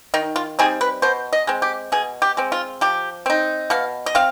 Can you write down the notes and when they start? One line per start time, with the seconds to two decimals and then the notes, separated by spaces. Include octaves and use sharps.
0.14 D#3 D#4
0.36 F4
0.59 G3 C4 D#4 G#4
0.81 B4
1.02 B2 C5
1.33 D#5
1.47 G#3 C4
1.62 G4
1.92 B2 G#4
2.22 G4
2.37 G#3 C4
2.52 F4
2.81 F3 G4
3.26 C4 D#4
3.70 B2 F5
4.06 D#5
4.15 C4 F5